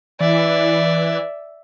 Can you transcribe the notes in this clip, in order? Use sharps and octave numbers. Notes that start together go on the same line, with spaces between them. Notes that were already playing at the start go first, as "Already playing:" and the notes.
E3 D5 E5